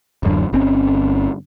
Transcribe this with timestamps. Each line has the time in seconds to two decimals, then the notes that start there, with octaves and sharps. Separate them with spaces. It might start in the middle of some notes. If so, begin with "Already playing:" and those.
0.23 D1 F#2 D3
0.53 G1 C4 C#4